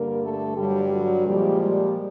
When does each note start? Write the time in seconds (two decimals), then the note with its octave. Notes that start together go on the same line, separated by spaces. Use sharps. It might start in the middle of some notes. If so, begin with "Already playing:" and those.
Already playing: G2 D3 G3 A#3 A#4
0.22 A3 A4
0.57 G2 D3 F#3 G3 G4
0.92 F#3 F#4
1.27 A#2 F3 G3 G#3 G4
1.61 G3 G4